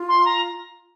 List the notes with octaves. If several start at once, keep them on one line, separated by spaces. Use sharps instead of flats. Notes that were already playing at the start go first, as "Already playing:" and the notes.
Already playing: F4
C6
A#5